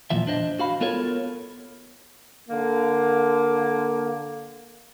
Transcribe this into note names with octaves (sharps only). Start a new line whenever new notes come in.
E2 A#2 E3 F3 E5
D4 C5 D#5
F#4 F5 B5
B3 F4 A4 A#4 C#5
D3 A#3